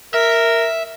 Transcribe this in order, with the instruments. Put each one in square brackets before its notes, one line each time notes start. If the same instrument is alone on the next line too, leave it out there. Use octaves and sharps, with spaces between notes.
[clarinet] A#4 [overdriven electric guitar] E5